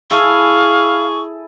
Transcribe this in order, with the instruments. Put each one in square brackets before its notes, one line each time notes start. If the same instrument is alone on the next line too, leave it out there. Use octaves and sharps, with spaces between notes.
[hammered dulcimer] E4 A4 G#5 [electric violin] G#4 [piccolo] F5 [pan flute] C#6